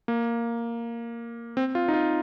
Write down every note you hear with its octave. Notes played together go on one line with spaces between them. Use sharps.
A#3
C4
F4
D#4
F4